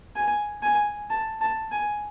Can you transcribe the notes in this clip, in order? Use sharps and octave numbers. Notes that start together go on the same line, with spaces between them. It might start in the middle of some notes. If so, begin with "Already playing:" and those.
G#5
G#5
A5
A5
G#5